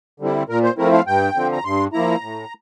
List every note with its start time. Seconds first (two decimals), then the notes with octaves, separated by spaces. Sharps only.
0.20 D3 G3 C4 E4
0.49 A#2 A#4
0.64 C5
0.78 F3 A3 C4 E4 A#4
0.93 F5
1.07 G2 G5
1.35 D3 F3 C4
1.52 A#5
1.64 G2 C6
1.93 F3 A#3 E4 A#5
2.22 A2